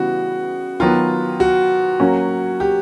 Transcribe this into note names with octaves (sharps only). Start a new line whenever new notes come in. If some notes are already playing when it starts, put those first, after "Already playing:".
Already playing: C#3 E3 G3 B3 F#4
D#3 F#3 B3 F4
F#4
F#3 A#3 C#4
G4